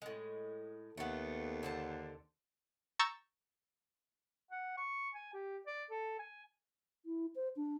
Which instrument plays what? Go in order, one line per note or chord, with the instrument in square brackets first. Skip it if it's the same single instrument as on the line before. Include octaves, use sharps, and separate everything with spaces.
[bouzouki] A2 G#3
[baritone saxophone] D#2 [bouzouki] A3 B3
[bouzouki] D3 C5 A5
[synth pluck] A#5 C#6 E6 G6 A6
[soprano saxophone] F#5
C#6
G#5
G4
D5
A4
G#5
[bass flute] E4
C5
D4